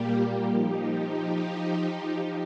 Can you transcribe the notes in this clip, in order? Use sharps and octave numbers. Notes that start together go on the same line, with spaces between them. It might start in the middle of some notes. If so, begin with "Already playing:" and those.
Already playing: A#2 G3 A#3 G4
F3 D#4 G4